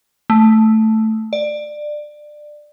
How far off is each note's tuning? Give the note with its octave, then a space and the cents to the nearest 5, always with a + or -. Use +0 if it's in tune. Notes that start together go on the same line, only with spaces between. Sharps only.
A3 +0
D5 +20